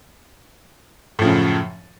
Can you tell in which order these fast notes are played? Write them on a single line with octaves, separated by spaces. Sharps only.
A2 F3 C#3 F#2